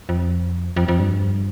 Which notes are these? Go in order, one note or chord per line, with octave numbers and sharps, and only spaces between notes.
F2
F2
F2
G2